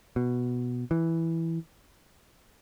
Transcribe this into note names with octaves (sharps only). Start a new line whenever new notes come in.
B2
E3